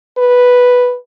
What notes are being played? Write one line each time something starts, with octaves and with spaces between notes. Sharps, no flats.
B4